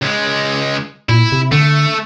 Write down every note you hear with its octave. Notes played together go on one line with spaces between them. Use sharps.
C#2 G#3
A#2 E4
C3
D3 A3